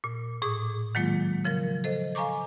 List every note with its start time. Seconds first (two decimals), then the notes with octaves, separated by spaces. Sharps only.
0.04 A#2
0.42 A2 G#4 D6 D#6
0.95 D#3 F#3 G#3 A#3 F4
1.45 C#3 F3 F#3 A#4
1.84 A4 C5 D#5
2.15 F5 G#5 A#5 C#6 D6